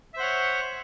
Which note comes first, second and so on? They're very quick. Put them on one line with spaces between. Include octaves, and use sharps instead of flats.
E5 C5 F#5 C#5